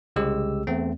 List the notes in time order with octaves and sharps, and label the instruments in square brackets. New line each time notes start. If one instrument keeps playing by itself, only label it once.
[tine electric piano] C2 C#3 G#3 G4 E6
E2 A3 C4